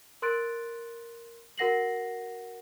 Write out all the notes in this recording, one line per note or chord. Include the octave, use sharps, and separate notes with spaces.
A#4 C6 F#6 A6 D7
F#4 A#4 F#5 A#6 C7 F#7